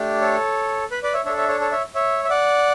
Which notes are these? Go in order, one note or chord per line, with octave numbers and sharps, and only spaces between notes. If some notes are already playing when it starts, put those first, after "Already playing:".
Already playing: A3 D4 G4
A4 C#5
B4
B4 D5
C#5 E5
D4 A4 C#5 E5
C#5 E5
A4 C#5
A4 C#5
C#5 E5
C#5 E5
E5
D5 F#5